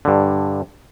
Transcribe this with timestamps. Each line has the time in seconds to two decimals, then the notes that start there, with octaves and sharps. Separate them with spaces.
0.05 G2 D3